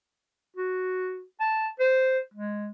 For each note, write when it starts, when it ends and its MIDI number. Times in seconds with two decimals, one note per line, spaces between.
0.57 1.23 66
1.40 1.69 81
1.80 2.19 72
2.34 2.71 56